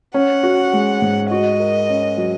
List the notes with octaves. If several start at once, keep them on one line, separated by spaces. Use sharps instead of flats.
C#4 F#5
F#4
G#3
G#2
F#4 D#5
A#4
C#4
F#3